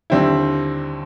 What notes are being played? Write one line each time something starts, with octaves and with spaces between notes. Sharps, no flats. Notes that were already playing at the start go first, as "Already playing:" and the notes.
D#2 D3 G3 C4 E4